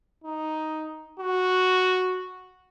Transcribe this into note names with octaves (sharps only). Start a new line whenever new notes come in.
D#4
F#4